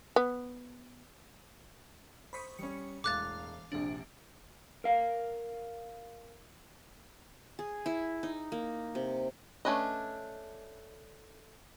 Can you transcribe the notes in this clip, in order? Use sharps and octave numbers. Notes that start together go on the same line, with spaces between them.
B3
C5 B5 C#6 D#6 B6
G3 C#4 C#7
E1 A2 F5 D6 F#6 A6
A#1 C3 D4 F#7
A#4 F5
G#4
E4
D#4
A#3
C3
A3 C#4 D4 B4 D#5